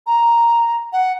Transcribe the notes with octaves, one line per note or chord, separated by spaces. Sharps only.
A#5
F#5